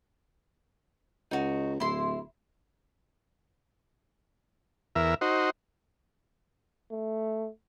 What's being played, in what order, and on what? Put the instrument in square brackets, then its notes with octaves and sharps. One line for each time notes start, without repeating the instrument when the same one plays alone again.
[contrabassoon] C#2 [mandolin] D#4 F#4
[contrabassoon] D1 [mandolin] E4 C6
[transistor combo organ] E2 A#4 E5
D#4 F#4 C5
[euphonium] A3